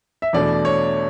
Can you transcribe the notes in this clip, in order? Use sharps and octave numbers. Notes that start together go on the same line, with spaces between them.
E5
E2 B2 A3 D4 D5
C#5